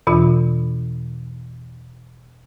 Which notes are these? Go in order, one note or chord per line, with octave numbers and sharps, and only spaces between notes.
E2 B2 E3 F4